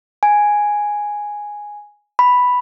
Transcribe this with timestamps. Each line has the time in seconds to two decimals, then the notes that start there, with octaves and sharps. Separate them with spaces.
0.23 G#5
2.19 B5